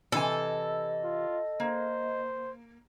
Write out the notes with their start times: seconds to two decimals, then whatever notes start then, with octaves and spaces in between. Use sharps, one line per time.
0.12 C3 E3 A4 D#5 G#5
1.04 F4
1.60 A#3 C5